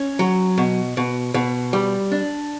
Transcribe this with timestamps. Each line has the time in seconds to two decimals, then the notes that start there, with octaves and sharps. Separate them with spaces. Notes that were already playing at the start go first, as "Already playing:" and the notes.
Already playing: C#4
0.19 F#3
0.58 B2
0.97 B2
1.34 B2
1.73 G3
2.12 D4